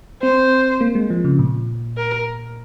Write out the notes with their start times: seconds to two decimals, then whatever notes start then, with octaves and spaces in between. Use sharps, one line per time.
0.22 C4 C5
0.81 A#3
0.95 G#3
1.10 F3
1.25 C#3
1.39 A#2
1.97 A#4